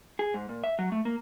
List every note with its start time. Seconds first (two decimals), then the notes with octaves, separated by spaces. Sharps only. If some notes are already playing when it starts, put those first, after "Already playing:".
0.19 G#4
0.34 G#2
0.49 A#2
0.64 E5
0.79 F#3
0.92 A3
1.05 A#3